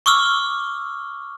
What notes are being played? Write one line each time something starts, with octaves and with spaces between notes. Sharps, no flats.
C#6 D6 E6 F6